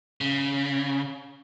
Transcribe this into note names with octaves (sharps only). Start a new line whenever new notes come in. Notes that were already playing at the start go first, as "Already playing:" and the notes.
C#3